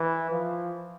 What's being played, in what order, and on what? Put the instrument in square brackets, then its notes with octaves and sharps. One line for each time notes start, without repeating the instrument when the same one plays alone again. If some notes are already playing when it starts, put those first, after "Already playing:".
Already playing: [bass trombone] E3
F3